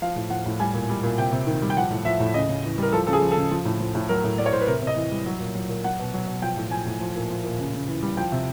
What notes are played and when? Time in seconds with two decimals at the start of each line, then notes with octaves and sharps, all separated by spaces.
0.02 F3 F5
0.16 A2
0.30 F3 F#5
0.46 A2
0.59 G3 G#5
0.74 A#2
0.90 G3
1.03 A#2
1.18 C3 G5
1.32 C3
1.47 D#3
1.62 G3
1.70 G5
1.77 F3 F#5
1.90 A2
2.05 F3 E5
2.20 A2
2.34 C#3 D#5
2.49 C#3
2.64 E3
2.78 G3 A#4
2.92 F3 A4
3.07 C#3 A4
3.13 G#4
3.22 F3
3.31 A4
3.37 C#3
3.51 F3
3.65 A2
3.80 F3
3.95 A2
4.09 F#3 A#4
4.24 A2
4.38 F#3 D5
4.46 C#5
4.53 A2 C5
4.61 B4
4.67 C3 A#4
4.82 C3
4.87 D#5
4.96 E3
5.11 G3
5.26 F#3
5.40 A#2
5.55 F#3
5.69 A#2
5.84 F#3 F#5
5.99 B2
6.14 F#3
6.27 B2
6.42 F3 G5
6.57 A2
6.71 F3 G#5
6.86 A2
7.01 F3
7.16 A#2
7.30 F3
7.44 A#2
7.59 C#3
7.74 C#3
7.88 E3
8.02 G3
8.17 F3 G5
8.32 C3